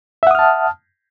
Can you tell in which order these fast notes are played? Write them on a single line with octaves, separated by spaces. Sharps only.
E5 F#5 D#6 F6 A5